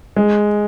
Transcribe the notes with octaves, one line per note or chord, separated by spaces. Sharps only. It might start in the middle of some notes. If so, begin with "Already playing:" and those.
G#3